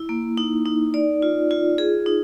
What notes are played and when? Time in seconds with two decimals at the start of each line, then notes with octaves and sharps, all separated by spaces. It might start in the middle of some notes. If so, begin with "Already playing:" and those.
Already playing: E4
0.09 A#3
0.37 D#4
0.66 D#4
0.94 D5
1.22 F4
1.51 F4
1.78 G#4
2.06 D#4